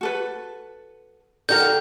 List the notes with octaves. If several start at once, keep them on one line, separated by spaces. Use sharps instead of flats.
F#4 A4 B4
D3 D#4 F#4 G4 A#4 G6